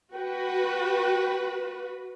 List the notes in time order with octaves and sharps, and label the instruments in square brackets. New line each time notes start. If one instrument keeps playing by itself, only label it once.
[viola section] F#4 B4 [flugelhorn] G5